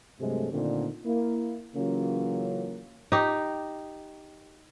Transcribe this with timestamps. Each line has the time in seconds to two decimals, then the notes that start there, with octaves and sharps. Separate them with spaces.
0.19 G2 C3 F#3 G#3 A3
0.51 A#2 D3 D#3 A3 C4
1.05 A#3 E4
1.75 C#3 E3 F#3 A#3 C#4 F4
3.12 D#4 G4